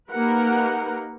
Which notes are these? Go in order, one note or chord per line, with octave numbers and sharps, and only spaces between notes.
A#3 D#4 G4 A#4 B4 F#5